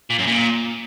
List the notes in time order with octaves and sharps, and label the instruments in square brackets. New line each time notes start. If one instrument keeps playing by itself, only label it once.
[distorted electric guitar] A#2
F#2
A#2